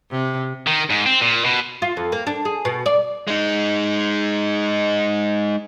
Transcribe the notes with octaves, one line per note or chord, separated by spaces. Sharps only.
C3
D#3
G#2
C4
A#2
B2
F4
F2
A#3
D4
G#4
B2
D5
G#3 D#4